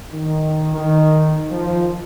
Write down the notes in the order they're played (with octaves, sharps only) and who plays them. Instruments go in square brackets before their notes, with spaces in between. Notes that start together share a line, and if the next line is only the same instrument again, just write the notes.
[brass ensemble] D#3
D#3
F3